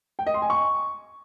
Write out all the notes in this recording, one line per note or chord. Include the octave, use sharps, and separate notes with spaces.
G5
D#5
C6
G#5
C#6